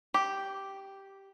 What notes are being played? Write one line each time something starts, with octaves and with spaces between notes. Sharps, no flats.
G4